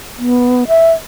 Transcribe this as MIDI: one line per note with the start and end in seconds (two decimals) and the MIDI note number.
0.18 0.64 59
0.68 0.91 76